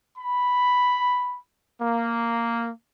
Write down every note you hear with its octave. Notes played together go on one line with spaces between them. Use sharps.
B5
A#3